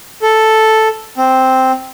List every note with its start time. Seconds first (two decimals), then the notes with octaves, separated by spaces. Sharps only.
0.22 A4
1.18 C4